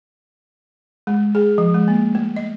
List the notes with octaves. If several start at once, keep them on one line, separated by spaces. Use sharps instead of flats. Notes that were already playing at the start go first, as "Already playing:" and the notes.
G#3
G#4
F3
G#3
A#3
A3
D#5